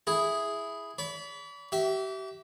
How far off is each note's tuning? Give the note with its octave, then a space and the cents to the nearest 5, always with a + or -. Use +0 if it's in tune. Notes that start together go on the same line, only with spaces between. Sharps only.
E4 +0 G#4 +0
D5 -45 B5 +0
G4 -35 E5 +0